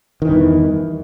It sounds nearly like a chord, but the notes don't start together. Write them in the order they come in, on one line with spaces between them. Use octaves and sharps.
D#3 E3 G2 E2